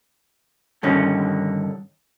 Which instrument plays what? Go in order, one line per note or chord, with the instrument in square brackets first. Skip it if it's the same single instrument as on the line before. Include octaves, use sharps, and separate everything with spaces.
[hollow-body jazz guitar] G2 D3 D#3 C#4 D#4